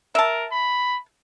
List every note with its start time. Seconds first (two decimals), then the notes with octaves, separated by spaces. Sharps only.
0.15 A#4 E5 A5
0.52 B5